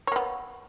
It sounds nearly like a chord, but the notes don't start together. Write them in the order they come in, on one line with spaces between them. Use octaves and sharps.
C#5 A#3 B3